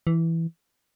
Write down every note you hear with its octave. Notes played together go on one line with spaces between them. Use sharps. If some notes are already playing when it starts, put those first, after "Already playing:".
E3